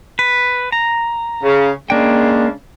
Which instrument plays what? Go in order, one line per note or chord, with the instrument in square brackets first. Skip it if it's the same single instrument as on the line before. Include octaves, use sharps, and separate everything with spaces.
[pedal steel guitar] B4
A#5
[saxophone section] C#3
[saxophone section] C#3 G#3 D4 [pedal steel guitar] A#3 G5